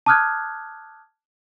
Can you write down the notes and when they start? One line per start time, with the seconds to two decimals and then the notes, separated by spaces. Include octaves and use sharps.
0.06 A5 D6 D#6 F6 F#6 G#6